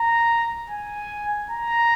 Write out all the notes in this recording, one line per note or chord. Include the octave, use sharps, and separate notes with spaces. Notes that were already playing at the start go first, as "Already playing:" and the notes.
Already playing: A#5
G#5
A#5